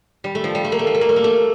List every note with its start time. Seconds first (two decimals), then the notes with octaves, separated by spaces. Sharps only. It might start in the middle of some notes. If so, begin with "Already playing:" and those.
0.24 G3
0.35 A3
0.44 F3
0.55 G3
0.64 A3
0.72 A#3
0.79 A3
0.87 A#3
0.94 A3
1.01 A#3
1.09 A3
1.16 A#3
1.24 A3